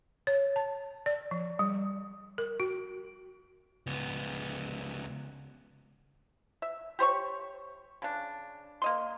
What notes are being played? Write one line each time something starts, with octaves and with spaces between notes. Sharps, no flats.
C#5
A5
D5
F3
G3
A#4
F#4
C#2 B3
E5
G4 C5 C#5 C#6
C#3 D4
A#3 D#5 C6